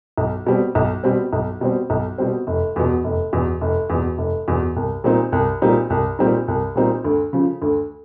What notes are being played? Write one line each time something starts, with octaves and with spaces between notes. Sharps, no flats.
B1
B2 G3 C4
B1
B2 G3 C4
B1
B2 G3 C4
B1
B2 G3 C4
F1
E2 B2
F1
E2 B2
F1
E2 B2
F1
E2 B2
C2
A#2 G3 C4 D#4
C2
A#2 G3 C4 D#4
C2
A#2 G3 C4 D#4
C2
A#2 G3 C4 D#4
D2
C#3 F3
D2